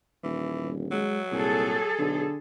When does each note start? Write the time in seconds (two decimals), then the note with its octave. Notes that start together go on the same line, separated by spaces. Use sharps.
0.23 D#1 E3
0.62 G1
0.92 F#3 G#3
1.32 C2 A#2 G#4 A4
1.98 B1 D3